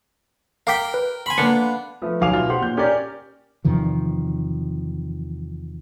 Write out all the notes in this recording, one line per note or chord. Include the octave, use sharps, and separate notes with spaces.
A#4 F5 G5 D6 B6
B4
G#5 B5 C6
A#3 B3 D4 C#7
F3 A3 B3
D1 B1 F5 G#5 D6 F7
B2 F4 E5
G4 C5 F#5 C6
A#2 G6
C#4 G4 A#4 C#5 D5
E2 C3 D#3 F3